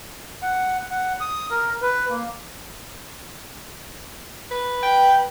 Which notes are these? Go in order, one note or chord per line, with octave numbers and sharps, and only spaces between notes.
F#5
F#5
D#6
A#4
B4
A#3
B4
G5